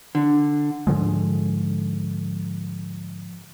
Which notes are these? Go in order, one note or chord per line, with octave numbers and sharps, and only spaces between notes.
D3
G#2 D3 F3 G#3